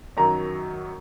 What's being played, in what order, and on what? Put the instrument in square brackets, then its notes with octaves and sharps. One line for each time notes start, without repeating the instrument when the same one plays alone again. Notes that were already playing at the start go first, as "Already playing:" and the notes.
[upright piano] F#2 D#3 F#3 A#5